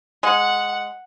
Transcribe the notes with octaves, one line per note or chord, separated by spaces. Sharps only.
G#3 F#5